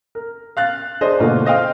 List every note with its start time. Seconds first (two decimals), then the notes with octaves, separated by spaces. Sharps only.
0.15 A#4
0.57 F5 F#6 A6
1.01 D4 G#4 C5 D#5
1.20 B2 D3 A3 A#3 F4
1.45 C5 D#5 F5 G5 F6